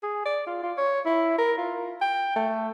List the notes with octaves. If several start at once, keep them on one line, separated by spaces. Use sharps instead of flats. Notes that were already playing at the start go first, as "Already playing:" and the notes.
G#4
D5
F4
F4
C#5
E4
A#4
F4
G5
A3